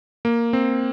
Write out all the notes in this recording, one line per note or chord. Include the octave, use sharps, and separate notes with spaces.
A#3
C4